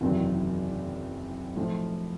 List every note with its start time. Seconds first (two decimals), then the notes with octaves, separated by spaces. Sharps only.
0.01 F#1 E2 C3 D#3 F#3
1.56 B1 A2 F3